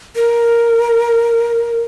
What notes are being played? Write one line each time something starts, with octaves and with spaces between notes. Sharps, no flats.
A#4